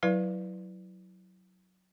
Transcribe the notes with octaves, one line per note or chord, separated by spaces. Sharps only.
F#3 E4 B4 D5 F5